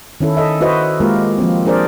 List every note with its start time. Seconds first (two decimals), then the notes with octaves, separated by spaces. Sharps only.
0.20 D#3 C#4 E4 A4
0.37 A4 D#5 E5
0.61 E4 F#4 B4 C5 D#5 E5
1.00 G#3 A#3 F4 G4 A#4
1.38 F3 A#3 C4
1.66 D4 G#4 A#4 C5 D5